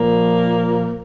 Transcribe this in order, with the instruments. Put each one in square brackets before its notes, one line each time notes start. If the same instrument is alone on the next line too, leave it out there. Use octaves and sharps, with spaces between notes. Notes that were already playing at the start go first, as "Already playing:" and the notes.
Already playing: [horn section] A#2 F3 A#3